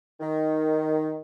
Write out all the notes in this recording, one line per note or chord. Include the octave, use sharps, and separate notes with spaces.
D#3